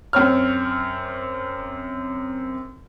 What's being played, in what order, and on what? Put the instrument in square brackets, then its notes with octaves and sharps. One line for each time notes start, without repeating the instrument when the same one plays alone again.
[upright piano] F#2 C4 C#5 F6